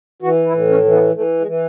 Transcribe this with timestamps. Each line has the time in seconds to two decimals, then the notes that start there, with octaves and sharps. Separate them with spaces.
0.22 E3 F#4
0.46 E4
0.53 A2
0.69 C#4
0.85 E3
0.92 B3
1.15 E3 A3
1.40 G#3
1.47 E3